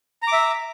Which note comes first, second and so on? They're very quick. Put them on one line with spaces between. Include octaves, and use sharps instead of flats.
A#5 D6 E5